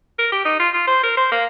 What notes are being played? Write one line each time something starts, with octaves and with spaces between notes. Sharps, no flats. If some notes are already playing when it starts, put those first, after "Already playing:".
A#4
G4
D#4
F4
F4
C5
A#4
C5
A#3